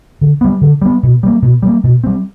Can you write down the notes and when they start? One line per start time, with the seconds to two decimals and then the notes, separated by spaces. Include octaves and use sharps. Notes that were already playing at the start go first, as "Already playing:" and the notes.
0.21 D3
0.41 G3 B3
0.61 D3
0.82 G3 B3
1.03 B2
1.23 G3 A#3
1.42 B2
1.63 G3 A#3
1.84 B2
2.04 G3 C4